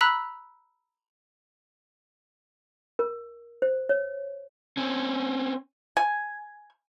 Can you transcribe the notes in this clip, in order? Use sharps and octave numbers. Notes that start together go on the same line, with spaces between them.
A#5 B5 E6 F#6 B6
A#4
C5
C#5
C4 C#4
G#5